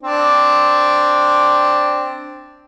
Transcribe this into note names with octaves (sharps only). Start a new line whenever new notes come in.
C4 D4